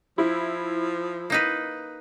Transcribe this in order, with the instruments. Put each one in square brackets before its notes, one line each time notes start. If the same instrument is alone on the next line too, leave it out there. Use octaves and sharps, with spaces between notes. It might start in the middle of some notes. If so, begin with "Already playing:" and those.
[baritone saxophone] F3 [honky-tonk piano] E4
[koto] A#3 D#4 B4